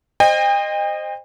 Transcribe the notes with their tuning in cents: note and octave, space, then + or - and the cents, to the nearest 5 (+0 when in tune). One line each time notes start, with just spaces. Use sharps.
C5 +0 D#5 -15 G5 +40